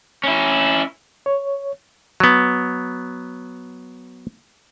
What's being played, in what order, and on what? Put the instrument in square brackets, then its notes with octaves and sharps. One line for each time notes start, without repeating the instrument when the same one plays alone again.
[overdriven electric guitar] C#4 E4
[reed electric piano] C#5
[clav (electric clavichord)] F#3 B3